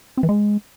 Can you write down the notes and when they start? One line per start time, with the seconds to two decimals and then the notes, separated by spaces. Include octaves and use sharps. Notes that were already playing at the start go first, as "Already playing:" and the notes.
0.17 C4
0.23 E3
0.29 G#3